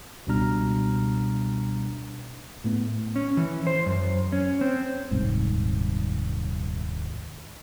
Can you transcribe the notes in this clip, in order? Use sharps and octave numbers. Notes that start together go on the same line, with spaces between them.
C#2 B2 G3 D4 A#5 F6
A2 A3 B3
C#4
E3
C5
F#2
C#4
C4
D#1 C2 G#2